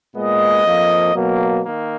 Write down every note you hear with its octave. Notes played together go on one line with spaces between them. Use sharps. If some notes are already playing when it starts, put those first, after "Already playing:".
A#2 G#3 B3 D#5
F2 F3 A#3
B2 F#3 A#3
D#3 A#3